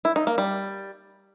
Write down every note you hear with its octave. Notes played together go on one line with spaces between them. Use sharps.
E4
D#4
A#3
G3